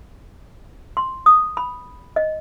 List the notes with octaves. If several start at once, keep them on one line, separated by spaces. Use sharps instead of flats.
C6
D#6
B5
D#5